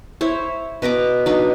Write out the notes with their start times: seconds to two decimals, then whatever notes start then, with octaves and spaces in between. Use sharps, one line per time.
0.21 E4 C5 C#5
0.82 B2 B4 A#5 D6
1.26 F#3 D4 D#4 B4